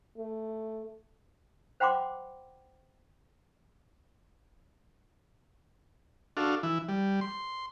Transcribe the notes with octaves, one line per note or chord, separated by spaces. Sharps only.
A3
C5 F#5 G5 B5 C6 D6
D4 F#4 A4 F5
E3 E4
G3
C6